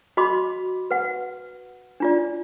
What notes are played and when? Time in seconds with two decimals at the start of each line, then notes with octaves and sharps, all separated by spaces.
0.17 F#4 D#5 B5 C6 D6
0.91 B4 F#5
2.00 D4 F4 D5